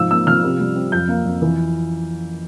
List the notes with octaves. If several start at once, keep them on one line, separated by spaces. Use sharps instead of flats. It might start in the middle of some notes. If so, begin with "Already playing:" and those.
Already playing: G#2 F3 E6
A#3 E6
F3 F6
C3
G3
C4
F2 G6
A#3
F2
E3